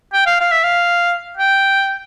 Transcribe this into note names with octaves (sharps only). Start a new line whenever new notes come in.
G5
F5
F5
E5
F5
G5